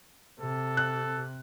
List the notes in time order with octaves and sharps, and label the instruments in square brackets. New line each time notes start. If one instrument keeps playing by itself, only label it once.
[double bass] C3 [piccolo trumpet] A4
[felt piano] F#6